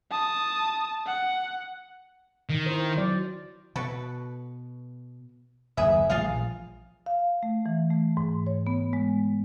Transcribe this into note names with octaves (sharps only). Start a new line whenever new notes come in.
A5 D#6
F#5
D#3
E4 C5
F#3 D5
B2 F#4 A4 B4
F#1 D#2 D#3 G#4 B4 E5
A1 G3 F4 G#4 F5
A#1
F5
A3
E3
A3
G#2
C#5
B3
G#3